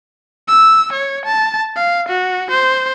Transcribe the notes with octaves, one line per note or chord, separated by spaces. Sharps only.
E6
C#5
A5
F5
F#4
C5